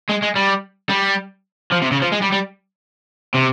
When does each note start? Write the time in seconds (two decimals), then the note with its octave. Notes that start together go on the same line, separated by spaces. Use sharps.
0.09 G#3
0.22 G#3
0.36 G3
0.90 G3
1.72 F3
1.82 C3
1.92 C#3
2.02 F3
2.12 G#3
2.22 G3
2.33 G3
3.34 C3